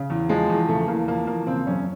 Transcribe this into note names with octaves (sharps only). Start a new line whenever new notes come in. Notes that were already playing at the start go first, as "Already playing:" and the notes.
Already playing: C#3
E2
F3 G#3
E2
C#3 A3
E2 A#3
F3 A#3
E2 A#3
C#3 C4
F#2 C#4